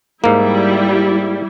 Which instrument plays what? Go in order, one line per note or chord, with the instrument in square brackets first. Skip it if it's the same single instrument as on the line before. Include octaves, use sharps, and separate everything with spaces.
[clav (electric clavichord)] G#2 A#3 [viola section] G3 E4